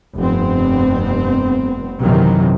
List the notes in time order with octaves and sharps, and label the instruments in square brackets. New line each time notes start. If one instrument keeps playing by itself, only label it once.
[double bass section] F1 G2 B3 C4
A#1 F#2 C3 D#3 E3 F#3